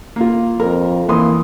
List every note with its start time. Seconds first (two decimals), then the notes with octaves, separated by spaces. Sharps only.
0.16 A#3 F4
0.60 F2 A#4
1.09 E3 A#3 C6 D#6